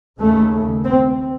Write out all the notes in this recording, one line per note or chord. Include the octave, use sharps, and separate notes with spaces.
D#2 C#3 A3
C4